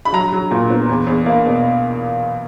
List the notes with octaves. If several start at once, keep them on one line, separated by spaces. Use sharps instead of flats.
B5
F#3 A#5
F#3
A#2
B3
E2
E2
A#3
B2